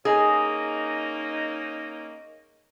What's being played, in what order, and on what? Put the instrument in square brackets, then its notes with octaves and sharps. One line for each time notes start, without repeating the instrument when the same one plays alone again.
[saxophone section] A#3 C#4 D#4 [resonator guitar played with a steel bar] G#4